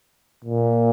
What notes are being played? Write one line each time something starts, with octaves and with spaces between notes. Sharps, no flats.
A#2